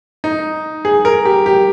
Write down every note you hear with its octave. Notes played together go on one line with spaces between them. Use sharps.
D#4
G#4
A#4
G4
G4